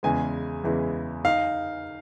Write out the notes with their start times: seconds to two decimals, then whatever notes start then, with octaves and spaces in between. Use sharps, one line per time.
0.03 E2 C#3 E3 G#3 G#5
0.64 E2 C#3 E3 G#3
1.25 D#4 F5